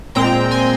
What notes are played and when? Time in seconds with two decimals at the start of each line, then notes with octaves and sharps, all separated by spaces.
0.15 A#2 G#3 C4 G5 A#5
0.51 G#5 C6